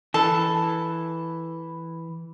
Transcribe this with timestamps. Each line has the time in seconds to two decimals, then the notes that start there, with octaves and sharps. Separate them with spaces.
0.14 E3 A4